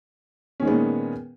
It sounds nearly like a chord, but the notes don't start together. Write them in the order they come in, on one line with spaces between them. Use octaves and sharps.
C#4 D#3 G#3 B3 A#2